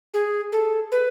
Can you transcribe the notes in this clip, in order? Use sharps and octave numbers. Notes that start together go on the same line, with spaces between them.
G#4
A4
B4